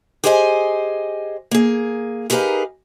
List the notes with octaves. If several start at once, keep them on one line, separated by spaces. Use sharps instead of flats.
G4 G#4 C5 D#5 E5 G#5
A#3 G#4
D#4 G4 G#4 A#4 B4 F5